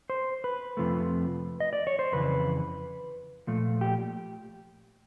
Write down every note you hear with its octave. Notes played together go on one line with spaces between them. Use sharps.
C5
B4
F2 C3 F3 A3
D#5
D5
C#5
C5
F2 C#3 E3 B4
A#2 F3 A3
G4